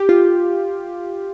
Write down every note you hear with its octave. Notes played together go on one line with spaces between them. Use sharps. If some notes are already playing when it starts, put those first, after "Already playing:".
Already playing: G4
F4